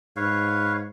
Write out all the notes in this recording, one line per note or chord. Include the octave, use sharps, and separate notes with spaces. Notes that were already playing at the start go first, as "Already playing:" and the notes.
G#2 B4 C#5 F5